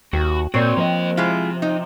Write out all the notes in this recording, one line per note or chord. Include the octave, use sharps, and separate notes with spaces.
D#2 F#4 G5
A#2 C4 F#4 C#5 D5
F3 A#3 D#5
C3 G#3 E4 F4
D#4